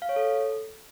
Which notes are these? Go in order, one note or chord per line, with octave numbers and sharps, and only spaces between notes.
F5
C#5
A4